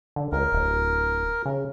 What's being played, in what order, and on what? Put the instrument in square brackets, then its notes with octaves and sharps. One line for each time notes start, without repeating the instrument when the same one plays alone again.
[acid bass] D3
[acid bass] C#2 [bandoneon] A#4
[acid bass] D1
C#3